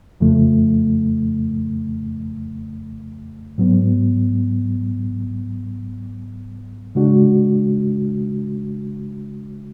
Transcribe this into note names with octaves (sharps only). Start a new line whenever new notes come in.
F2 C#3 F3 A3
G#2 F#3 B3
C#3 G#3 D4 F#4